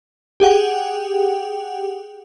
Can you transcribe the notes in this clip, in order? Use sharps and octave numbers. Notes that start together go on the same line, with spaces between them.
G4 G#4 F#5 G5